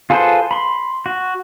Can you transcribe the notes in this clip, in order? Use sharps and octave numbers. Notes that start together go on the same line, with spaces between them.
F4 G#4 A4 B4 C5
B5 C6
F#4